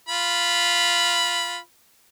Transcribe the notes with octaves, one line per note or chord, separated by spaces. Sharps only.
F4 B5